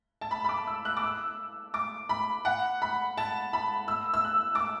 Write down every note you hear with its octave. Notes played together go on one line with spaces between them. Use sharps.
A5
B5
B5
D6
E6
F#6
D6
E6
D6
B5
F#5
B5
A5
B5
E6
E6
F#6
D6
E6